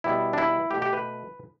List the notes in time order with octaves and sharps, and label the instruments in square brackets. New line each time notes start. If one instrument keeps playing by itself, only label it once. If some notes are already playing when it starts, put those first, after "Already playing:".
[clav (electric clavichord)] B2 G3 B3 E4
D4
E4
B2 A3 G4
G4
B4